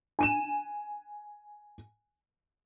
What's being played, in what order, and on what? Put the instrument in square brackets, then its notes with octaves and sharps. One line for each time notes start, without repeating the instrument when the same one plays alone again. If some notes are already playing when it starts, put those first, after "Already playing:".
[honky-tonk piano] G#5 D#7 E7